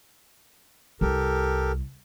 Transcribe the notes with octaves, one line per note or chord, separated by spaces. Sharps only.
C2 G4 A4 A#4